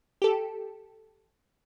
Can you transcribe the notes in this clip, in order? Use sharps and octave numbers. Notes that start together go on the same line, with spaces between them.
G4 A4